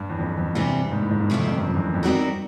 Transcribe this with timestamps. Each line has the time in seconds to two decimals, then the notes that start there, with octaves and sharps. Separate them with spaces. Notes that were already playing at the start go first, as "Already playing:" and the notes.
Already playing: G2
0.10 E2
0.19 F2
0.38 F2
0.55 G2 C3 E3 G3 C4
0.92 G#2
1.01 A2
1.11 G#2
1.21 G2
1.30 C3 F3 A3 C4
1.39 F2
1.48 G2
1.57 F#2
1.66 F2
1.75 E2
1.94 F2
2.03 G3 C4 D#4 F#4 A#4